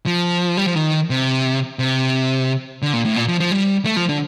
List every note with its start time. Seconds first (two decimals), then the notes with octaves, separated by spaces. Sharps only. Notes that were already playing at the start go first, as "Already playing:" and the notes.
0.06 F3
0.57 G3
0.66 F3
0.75 D#3
1.10 C3
1.79 C3
2.82 D3
2.93 A#2
3.05 A2
3.16 A#2
3.28 F3
3.40 F3
3.52 G3
3.85 A3
3.97 F3
4.09 D3